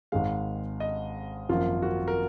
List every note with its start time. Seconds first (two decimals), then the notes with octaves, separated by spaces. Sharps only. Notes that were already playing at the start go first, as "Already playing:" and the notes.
0.12 G#1 G#2 D#3 G#3 F5
0.80 D#5
1.49 G#1 F#2 F3 A#3 F4
1.82 F#4
2.08 A#4